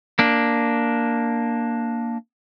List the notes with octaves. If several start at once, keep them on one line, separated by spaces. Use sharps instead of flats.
A#3 D4